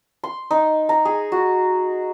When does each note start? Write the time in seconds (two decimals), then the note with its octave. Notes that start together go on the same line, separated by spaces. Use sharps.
0.24 C6
0.51 D#4
0.89 A#5
1.05 G#4
1.32 F#4